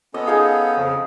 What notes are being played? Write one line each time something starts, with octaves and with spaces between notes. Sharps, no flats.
B3 C#4 A4 D#5
D#4 G#4 F5
F2 C#3 F3